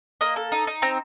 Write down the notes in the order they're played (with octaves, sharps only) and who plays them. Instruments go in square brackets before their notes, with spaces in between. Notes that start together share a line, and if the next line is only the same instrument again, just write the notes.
[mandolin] A#3 D#5
A4
D#4
D#4
C4 A#5